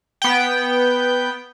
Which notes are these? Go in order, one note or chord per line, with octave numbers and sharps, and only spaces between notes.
B3 G5